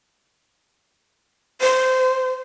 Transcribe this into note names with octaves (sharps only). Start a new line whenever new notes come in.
C5